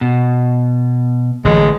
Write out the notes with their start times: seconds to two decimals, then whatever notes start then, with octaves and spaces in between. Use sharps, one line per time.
0.01 B2
1.45 A1 D3 E3 G#3